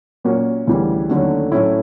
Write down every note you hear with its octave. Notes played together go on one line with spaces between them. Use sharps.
A#2 F#3 A#3 C#4 F#4
D2 C#3 E3 G3
D#2 D3 F#3 A3 C#4
A2 F#3 A3 C#4 E4